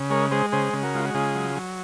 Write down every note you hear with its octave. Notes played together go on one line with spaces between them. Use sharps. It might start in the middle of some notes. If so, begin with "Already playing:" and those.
Already playing: C#3
G#3 A#4 C#5
G#3 G#4 C5
C#3 G#4 C5
C#3
F#4 A#4
G#3 F4
F#4
C#3 F4 G#4
F#3
F#3